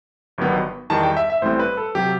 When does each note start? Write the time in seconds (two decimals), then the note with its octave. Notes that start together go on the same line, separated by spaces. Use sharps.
0.38 G1 G2 D#3 F#3 B3
0.90 E2 D#3 G3 A5
1.03 G5
1.17 E5
1.30 E5
1.42 A1 A2 G3 C4 C5
1.59 B4
1.77 A4
1.95 C3 F#3 G4